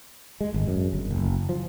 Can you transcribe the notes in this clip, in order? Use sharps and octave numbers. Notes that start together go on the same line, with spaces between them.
G#3
G#1
F#2
G1
F#1
F3